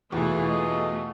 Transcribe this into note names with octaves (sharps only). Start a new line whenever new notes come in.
E2 B2 E3 A3 F4 G#4
A3 D#5